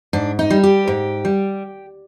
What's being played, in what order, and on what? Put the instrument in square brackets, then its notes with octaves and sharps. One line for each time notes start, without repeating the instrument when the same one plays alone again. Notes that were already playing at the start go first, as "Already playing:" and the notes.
[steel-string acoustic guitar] G#2 D4
D#4
G3
G4
G#2
G3